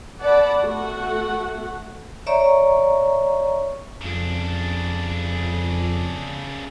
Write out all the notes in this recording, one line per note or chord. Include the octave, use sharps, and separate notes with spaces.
D5 F#5 A5 B5
A3 F#4 F#5
C#5 D5 E5 A#5 C#6
F2 C#3 D4